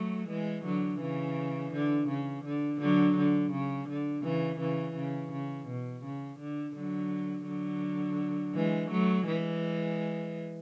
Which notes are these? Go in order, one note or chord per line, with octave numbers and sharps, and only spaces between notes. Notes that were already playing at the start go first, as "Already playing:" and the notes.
Already playing: F#3 A3
E3 G#3
D3 F#3
C#3 E3
D3
C#3
D3
D3 F#3
D3
C#3
D3
C#3 E3
C#3 E3
C#3
C#3
B2
C#3
D3
D3 F#3
D3 F#3
E3 G#3
F#3 A3
E3 G#3